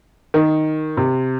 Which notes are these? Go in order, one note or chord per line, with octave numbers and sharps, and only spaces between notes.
D#3
C3